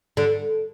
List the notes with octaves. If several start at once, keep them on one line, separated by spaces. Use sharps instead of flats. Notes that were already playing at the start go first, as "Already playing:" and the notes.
D3